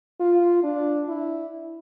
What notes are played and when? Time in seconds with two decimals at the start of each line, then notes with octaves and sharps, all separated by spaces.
0.20 F4
0.64 D4
1.09 E4